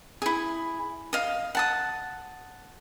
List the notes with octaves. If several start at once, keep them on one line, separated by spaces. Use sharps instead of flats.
E4 G#4
D#5 F5
F#5 A5 D#6